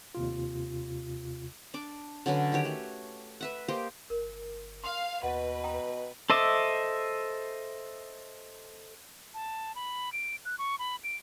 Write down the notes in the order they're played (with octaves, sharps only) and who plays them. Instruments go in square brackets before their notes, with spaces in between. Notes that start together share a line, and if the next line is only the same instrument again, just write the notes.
[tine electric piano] D#2 C3 F4
[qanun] D4 D6
D3 F#3 C#4 B4
D#3 F#4 G4 C#5
A3
B4 E5 F#5
A#3 G4 C5 D#5
[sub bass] G1 [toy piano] A#4
[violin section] F5 [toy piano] C6
[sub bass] D#2 [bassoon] B2 [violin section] B4 [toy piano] D#5 F#5
[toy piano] G5 A#5 D#6
[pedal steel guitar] A4 C5 D#5 E5 D6
[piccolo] A5
B5
D7
F#6
C#6
B5
D7